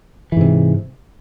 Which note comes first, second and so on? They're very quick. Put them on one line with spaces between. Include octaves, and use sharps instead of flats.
E3 G#2 C3